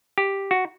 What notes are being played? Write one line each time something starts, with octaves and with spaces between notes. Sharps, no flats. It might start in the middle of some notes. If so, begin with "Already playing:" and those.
G4
F#4